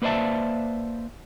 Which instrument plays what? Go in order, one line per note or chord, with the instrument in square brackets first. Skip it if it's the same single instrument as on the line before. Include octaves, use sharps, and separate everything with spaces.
[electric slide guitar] A#3 B4 C5 D5 E5 A5